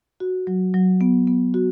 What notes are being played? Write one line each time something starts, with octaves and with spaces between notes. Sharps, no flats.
F#4
F#3
F#3
B3
B3
F#4